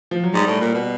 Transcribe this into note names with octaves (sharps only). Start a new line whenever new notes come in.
F3
F#3
G#2 G3
A2
A#2
B2